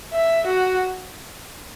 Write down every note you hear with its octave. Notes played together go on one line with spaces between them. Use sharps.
E5
F#4